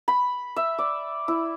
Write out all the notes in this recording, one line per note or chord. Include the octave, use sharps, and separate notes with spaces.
B5
E5
D5
E4